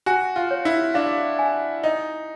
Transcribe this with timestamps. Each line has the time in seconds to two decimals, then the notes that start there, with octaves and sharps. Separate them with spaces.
0.06 F#4 G#5
0.36 F4
0.51 C#5
0.65 E4
0.94 D4 F5
1.39 G#5
1.83 D#4 D#5